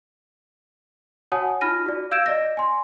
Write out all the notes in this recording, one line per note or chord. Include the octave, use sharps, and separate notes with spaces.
F#4 C#5 F#5 G#5 A5 D#6
D#4 F4 B5 F6 A#6 D#7
F#4 D5
F5 E6 G6 G#6 D7 E7
D5 D#5 A#6
G#5 C6